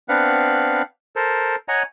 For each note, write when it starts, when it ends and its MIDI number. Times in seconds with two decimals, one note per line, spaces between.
0.09 0.82 59
0.09 0.82 60
0.09 0.82 62
0.09 0.82 71
0.09 0.82 77
0.09 0.82 78
1.16 1.56 69
1.16 1.56 70
1.16 1.56 72
1.68 1.83 73
1.68 1.83 75
1.68 1.83 78
1.68 1.83 80
1.68 1.83 82